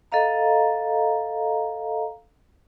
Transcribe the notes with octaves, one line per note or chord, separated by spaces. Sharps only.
A4 D#5 F5 A#5